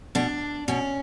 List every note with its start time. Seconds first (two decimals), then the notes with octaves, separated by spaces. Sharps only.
0.15 B2 D4
0.68 B2 C#4